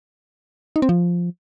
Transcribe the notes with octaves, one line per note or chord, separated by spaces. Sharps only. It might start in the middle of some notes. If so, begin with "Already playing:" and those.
D#4
C4
F3